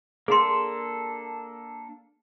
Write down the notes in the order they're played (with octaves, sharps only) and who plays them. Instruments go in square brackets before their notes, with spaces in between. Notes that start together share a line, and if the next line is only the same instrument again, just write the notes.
[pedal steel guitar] A#3 D4 A4 [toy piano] G#4 C6